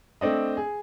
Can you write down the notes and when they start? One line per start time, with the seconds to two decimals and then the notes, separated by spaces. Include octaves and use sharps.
0.21 A3 C4 D4 D#5
0.57 G#4